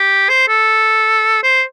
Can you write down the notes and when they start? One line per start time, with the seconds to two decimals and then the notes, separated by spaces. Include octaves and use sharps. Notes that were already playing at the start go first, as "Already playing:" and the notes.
Already playing: G4
0.29 C5
0.48 A4
1.43 C5